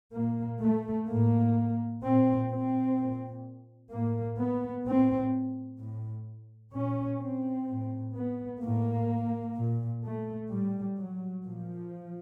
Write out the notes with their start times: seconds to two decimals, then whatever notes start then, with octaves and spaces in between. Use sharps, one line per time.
0.13 A#2 A#3
0.61 A3
1.08 A2 A#3
2.02 A#2 C4
2.49 C4
2.97 A#2
3.91 A2 A#3
4.38 B3
4.85 A2 C4
5.79 A2
6.73 A#2 C#4
7.20 C4
7.68 A2
8.15 B3
8.61 A2 A#3
9.56 A#2
10.03 A3
10.50 A2 G3
10.98 F#3
11.44 A#2 F3